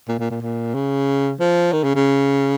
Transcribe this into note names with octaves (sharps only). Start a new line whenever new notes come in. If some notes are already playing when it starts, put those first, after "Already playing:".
A#2
A#2
A#2
A#2
C#3
F3
D#3
C#3
C#3